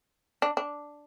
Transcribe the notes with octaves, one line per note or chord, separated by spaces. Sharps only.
D4
D4